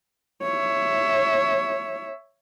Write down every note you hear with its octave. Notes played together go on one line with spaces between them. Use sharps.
C#5 E5